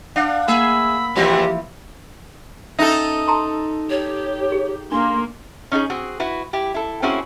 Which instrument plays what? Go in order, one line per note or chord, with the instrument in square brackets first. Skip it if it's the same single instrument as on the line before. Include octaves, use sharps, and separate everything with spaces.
[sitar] D4 [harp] F5 F#5
[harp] A#3 [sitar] G#4 E5 [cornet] B5 [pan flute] E6
[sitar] A#2 C#3 C4 [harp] E3 F3 [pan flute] G4
[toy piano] C#4 E5 [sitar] D#4 A4
[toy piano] A5 A#5 C6
[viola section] G4 [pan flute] C#5
[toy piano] G#4
[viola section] A#3 [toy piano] D4 [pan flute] C6
[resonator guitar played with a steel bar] C#4 D#4 G4 G#4
C4 F#4 G#4
E4 F#4 B4
E4 G4
E4 A4
A#3 C4 C#4 E4 F#4 G#4